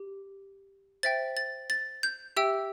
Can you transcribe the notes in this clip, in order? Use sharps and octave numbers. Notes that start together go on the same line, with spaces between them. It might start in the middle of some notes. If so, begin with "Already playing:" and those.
Already playing: G4
C5 E5 G5 A6
A6
A6
G6
G4 E5 G5 E6